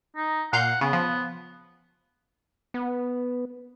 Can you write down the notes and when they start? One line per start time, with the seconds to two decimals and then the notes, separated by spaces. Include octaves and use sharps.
0.16 D#4
0.53 A#2 F5 F#5 G6
0.81 C#3 B3
0.93 F3
2.74 B3